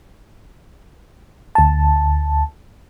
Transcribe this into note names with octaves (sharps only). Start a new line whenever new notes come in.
D2 A5